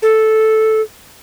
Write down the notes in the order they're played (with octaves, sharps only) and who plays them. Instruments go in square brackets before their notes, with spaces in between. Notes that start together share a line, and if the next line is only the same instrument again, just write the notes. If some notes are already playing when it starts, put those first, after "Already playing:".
[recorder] A4